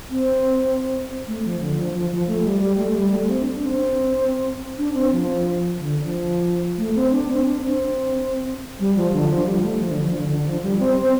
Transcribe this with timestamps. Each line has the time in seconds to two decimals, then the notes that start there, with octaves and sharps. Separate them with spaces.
0.10 C4
1.27 A3
1.45 F3
1.60 D3
1.78 F3
1.94 F3
2.11 F3
2.27 A3
2.45 G3
2.61 G3
2.77 A3
2.95 G3
3.11 A3
3.28 C4
3.41 D4
3.54 D4
3.65 C4
4.78 D4
4.94 C4
5.12 F3
5.78 D3
6.03 F3
6.78 A3
6.95 C4
7.11 D4
7.29 C4
7.45 D4
7.62 C4
8.80 G3
8.96 F3
9.13 D3
9.30 F3
9.46 G3
9.62 A3
9.79 F3
9.91 D3
10.04 F3
10.17 D3
10.29 D3
10.46 F3
10.63 G3
10.79 C4
10.96 C4